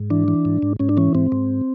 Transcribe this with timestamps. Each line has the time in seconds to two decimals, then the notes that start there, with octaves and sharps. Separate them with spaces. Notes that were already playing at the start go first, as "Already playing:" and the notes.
Already playing: G#2
0.10 E3 D4
0.28 E3
0.45 G#2
0.62 G#2
0.79 G#2 C#4
0.89 D4
0.97 E3 C#4
1.15 G#2 C4
1.32 G#2